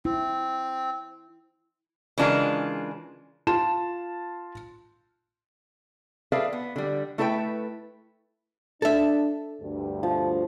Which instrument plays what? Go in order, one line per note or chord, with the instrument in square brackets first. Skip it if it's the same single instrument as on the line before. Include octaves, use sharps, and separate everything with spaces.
[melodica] C4 [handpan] E4
[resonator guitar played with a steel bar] C#3 E3 G#3 D4 F4 A#4
[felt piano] F4 A5 E7
[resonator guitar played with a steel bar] G#4 A4 B4 D5 E5 F5
B3
D3 G3
A3 E4 A4 B4 D5 G5
[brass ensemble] D4 [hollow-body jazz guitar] A4 E5
[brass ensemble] D2 G2
[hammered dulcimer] F3